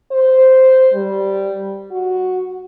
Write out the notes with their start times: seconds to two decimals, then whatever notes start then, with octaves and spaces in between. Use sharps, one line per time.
0.12 C5
0.94 G3
1.91 F#4